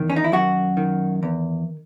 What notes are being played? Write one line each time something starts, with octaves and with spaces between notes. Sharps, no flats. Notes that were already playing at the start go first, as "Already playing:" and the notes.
Already playing: E2 D#3
C#4
D#4
E4
F#2 F#4
D#3
E2